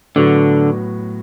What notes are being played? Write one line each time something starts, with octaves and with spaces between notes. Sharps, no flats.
A2 D3 F#3 B3 F#4